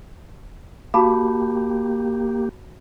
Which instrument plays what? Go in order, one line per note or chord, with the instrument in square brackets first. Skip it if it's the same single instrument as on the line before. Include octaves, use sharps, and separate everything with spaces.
[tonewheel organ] A#3 G4 [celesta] F#4 A5 B5